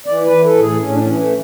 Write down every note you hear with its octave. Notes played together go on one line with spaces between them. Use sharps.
E3 D5
B4
E3
A4
A2
G#4
A2 C#4
D4
C#4
E3
A3